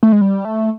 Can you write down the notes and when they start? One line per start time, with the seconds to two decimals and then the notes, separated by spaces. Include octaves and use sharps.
0.03 A3
0.12 G#3
0.21 G3
0.45 A3